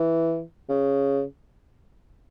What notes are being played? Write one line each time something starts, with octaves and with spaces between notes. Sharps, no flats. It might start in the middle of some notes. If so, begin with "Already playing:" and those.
Already playing: E3
C#3